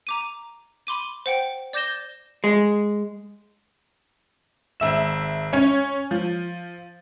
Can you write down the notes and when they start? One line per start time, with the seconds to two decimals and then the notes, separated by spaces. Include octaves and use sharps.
0.07 A#5 D6 D#7
0.87 B5 C6 D6 D#7
1.26 C5 F#5 G5
1.73 D5 D6 G6 A#6 E7 G7
2.44 G#3
4.80 G#1 E5 E7
5.53 C#4 C#5
6.11 F3